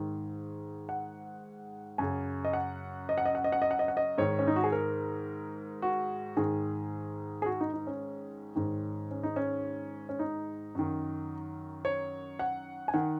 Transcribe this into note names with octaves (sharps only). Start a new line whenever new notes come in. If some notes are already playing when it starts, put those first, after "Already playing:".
Already playing: G#2 D#3
F#5
F#2 C#3 G#5
D#5
F#5
D#5
F#5
D#5
F#5
D#5
F#5
D#5
F#5
D#5
F#5
D#5
G#2 D#3 C#5
C#4
D#4
F#4
G#4
A#4
F#4
G#2 D#3 G#4
G#4
F#4
D#4
D#4
C#4
G#2 D#3
C#4
D#4
C#4
C#4
D#4
F#2 D#3
C#5
F#5
G#5
D#3 F#5